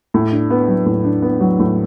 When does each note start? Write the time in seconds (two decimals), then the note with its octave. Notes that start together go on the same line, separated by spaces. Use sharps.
0.14 A2
0.32 D4
0.50 B3
0.68 F#3
0.86 A2
1.04 D4
1.22 B3
1.41 F#3
1.59 A2